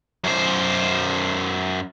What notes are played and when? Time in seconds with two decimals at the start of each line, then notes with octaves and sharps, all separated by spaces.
0.24 F#2 C5